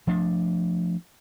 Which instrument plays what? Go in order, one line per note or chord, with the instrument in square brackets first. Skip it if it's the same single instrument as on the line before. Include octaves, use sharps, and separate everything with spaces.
[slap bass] F3 A3 D4